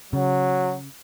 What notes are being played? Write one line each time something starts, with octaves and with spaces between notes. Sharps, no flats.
C#3 F#3